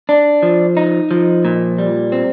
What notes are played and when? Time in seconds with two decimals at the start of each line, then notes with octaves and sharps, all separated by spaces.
0.09 D4
0.43 F3
0.77 D#4
1.11 F3
1.45 A#2
1.78 G3
2.12 C4